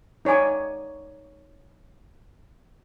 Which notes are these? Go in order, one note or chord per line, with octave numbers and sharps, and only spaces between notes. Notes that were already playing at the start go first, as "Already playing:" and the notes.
D#4 C#5 D5 G#5 D6